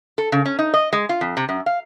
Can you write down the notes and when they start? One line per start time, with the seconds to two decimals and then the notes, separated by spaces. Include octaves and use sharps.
0.18 A4
0.32 C#3
0.46 C#4
0.59 D#4
0.74 D#5
0.93 G#3
1.09 F4
1.21 F2
1.37 C3
1.49 F#2
1.66 F5